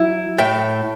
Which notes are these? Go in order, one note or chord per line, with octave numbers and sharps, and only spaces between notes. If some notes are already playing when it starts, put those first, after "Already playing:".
Already playing: F#3 E4
A2 E5 G5